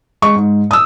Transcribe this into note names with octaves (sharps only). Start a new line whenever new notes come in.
G#3 C#6
G#2
D#6 E6